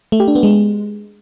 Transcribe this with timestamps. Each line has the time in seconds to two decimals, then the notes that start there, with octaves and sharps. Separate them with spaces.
0.12 A3
0.20 G4
0.28 D4
0.35 B3
0.43 G#3